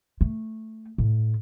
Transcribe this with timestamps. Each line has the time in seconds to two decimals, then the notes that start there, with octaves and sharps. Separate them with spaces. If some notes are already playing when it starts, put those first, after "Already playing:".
0.21 A3
0.98 A2